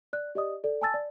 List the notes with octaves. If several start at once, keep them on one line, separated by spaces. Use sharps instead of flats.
D5 F#6
G4 D5 D#5 D#6
A4 D5
G#5 A5 E6 A6
D5